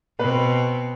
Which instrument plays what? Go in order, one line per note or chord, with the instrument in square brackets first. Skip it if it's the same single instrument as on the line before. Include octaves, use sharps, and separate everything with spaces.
[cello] B2 C4 [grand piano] B4